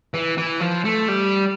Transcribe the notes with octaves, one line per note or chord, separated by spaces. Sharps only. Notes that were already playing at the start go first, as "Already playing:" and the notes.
E3
E3
F3
A3
G3